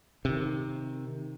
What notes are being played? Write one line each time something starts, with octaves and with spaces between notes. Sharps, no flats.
C3 D#3